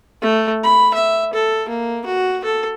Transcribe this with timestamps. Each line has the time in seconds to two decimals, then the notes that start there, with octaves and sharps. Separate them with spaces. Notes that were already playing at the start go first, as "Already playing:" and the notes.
0.22 A3
0.64 B5
0.94 E5
1.34 A4
1.69 A#3
2.06 F#4
2.45 A4